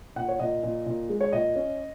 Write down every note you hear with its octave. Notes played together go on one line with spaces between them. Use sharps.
A#2 F#5
C#5
A#2 D#5
A#2
A#2
G#3
C#5
A#2 D#5
C#4